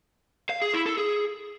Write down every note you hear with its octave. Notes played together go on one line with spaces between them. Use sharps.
F5
G#4
E4
A4
G#4